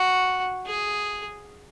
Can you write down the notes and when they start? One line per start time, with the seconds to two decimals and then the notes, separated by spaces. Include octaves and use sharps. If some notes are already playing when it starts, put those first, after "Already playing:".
Already playing: F#4
0.66 G#4